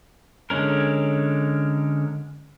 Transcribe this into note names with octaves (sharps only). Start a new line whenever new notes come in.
D3 G#3 C#4 A#4